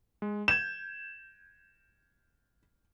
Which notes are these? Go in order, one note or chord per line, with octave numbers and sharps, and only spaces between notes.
G#3
G6 G#6 E7